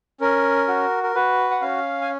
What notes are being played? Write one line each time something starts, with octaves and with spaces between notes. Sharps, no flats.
C#4 A#4
F#4
A#4
F#4 B4
F#5
C#4 F5
G#5